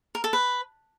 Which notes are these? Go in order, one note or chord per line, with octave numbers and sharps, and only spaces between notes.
A#4
A4
B4